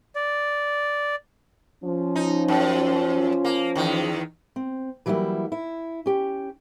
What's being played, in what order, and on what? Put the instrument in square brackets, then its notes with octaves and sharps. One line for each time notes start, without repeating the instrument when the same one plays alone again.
[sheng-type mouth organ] D5
[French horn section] F3 C#4
[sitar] D#4
F#2
A#3
E2 D#3
[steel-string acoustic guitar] C4
E3 F#3 G3 A#3 E4
E4
C#4 G4